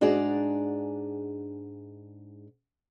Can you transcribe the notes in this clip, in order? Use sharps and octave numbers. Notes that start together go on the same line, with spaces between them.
G#2 D4 F#4 G#4 D5 A#5